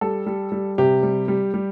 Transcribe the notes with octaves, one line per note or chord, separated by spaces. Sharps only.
G3 A4
G3
G3
C3 G4
G3
G3
G3